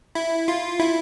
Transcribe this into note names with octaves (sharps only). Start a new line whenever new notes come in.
E4
F4
E4